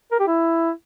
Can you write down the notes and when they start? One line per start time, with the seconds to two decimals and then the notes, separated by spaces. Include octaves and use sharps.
0.12 A#4
0.20 G4
0.27 E4